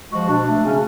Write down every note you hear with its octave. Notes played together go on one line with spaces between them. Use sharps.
F3 G#3 F#4
B2 D4
A3
C#3 C#4